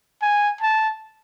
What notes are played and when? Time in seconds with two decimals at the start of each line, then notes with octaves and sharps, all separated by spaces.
0.22 G#5
0.61 A5